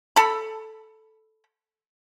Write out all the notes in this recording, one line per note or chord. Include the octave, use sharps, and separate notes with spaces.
A4 B5